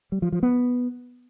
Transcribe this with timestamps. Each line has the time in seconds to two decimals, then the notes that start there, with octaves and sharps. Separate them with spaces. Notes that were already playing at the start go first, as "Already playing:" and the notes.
0.12 G3
0.22 F3
0.32 F3
0.43 B3